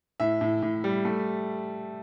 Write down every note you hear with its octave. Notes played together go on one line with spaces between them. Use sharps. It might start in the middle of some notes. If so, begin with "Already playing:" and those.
A2 E5
A2
A2
G3
A3